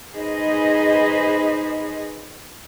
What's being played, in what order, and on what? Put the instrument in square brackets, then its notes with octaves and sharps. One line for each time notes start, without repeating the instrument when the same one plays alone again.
[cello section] D#4 G#4 B4 C5 D#5